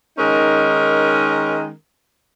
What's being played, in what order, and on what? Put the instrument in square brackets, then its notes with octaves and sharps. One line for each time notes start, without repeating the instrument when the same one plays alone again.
[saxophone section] D#3 G#3 C#4 D#4 A#4